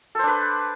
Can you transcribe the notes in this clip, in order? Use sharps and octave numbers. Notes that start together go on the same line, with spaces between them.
D4 A4 B4 C5